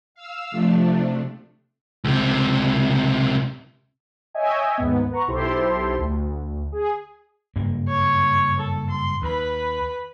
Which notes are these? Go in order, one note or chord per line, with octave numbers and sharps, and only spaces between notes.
F5 E6
C3 F3 A3 D4
C#2 C3
C#5 D#5 E5 G5 G#5
D#2 G#2 B3
B4 F#5 A#5 C#6
B1 E4 G4 A4 C5 C6
D2
G#4
F#1 G2 A#3
C#5
A4
C6
D#2 B4 B5